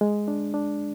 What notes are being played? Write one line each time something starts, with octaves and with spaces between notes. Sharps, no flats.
G#3
D4
D4